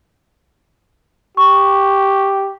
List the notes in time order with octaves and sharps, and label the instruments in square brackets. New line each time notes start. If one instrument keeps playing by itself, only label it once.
[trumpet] G4 [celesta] C#6